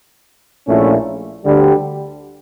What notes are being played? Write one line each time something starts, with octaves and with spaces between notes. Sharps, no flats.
A#1 A#2 A3 C#4 E4
D2 D3 G3